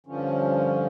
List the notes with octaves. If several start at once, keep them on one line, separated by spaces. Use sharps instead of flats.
G2 D3 F3 C#4